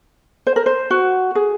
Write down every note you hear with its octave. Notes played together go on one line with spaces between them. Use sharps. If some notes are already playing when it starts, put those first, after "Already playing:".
C5
A#4
C5
F#4
G#4